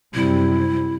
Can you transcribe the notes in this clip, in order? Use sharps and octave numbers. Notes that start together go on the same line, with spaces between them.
F#2 C3 G3 E4